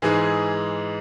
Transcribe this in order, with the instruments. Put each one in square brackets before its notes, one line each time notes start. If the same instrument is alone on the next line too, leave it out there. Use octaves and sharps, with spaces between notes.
[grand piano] G#2 E3 G#3 G#4